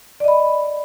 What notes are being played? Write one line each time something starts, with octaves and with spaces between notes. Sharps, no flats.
D5 D#5 B5